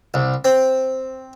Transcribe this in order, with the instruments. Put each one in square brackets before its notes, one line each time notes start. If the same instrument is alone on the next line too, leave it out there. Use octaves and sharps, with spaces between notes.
[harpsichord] C2
C4